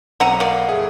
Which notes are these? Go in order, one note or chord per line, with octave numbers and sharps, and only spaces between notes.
B1 C4 F#5 A#5 D#7
A#3 D5 F5 F#5
G1 G#4 A4 E5